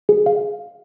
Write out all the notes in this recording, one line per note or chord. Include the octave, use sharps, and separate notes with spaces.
G#4
F5